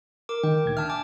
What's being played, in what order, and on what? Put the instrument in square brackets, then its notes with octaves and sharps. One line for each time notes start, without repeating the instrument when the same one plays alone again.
[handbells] A#4 D6
[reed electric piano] D#3 [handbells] G5
[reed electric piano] D2 A#2 G#6
[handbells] D4 A5 F6 [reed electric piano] E5
[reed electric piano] G#5 [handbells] D6